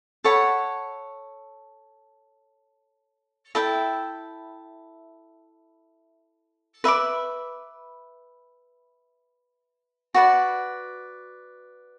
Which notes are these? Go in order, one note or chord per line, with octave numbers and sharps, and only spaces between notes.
A4 C#5 F#5 B5
E4 A4 E5 G5
B4 E5 B5 D6
F#4 B4 D5